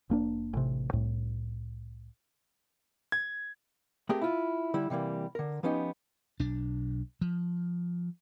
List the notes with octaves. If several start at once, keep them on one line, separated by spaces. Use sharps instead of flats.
F1 A#3 D4
A1 C3
C2 A2
G#6
A3 A#3 C4 G4 G#4 A#4
E4 F4
D3 G3 E4
C3 E3 G3 A#3
D3 A#4
F3 B3 C#4 D#4 G4
B1 D4
F3